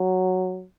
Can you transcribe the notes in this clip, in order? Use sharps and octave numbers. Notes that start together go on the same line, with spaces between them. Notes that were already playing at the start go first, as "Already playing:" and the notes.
Already playing: F#3